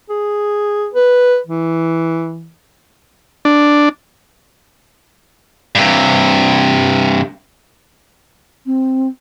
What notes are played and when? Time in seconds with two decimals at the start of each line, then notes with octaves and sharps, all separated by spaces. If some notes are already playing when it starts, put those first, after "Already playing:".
0.10 G#4
0.94 B4
1.47 E3
3.45 D4
5.75 G2 C3
8.66 C4